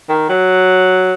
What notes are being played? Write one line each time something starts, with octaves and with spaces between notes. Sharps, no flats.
D#3
F#3